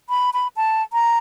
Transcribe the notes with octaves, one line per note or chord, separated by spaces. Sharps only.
B5
B5
A5
A#5